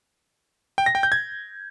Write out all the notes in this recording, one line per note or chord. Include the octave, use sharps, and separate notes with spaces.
G5
A#6
G5
G6
G#6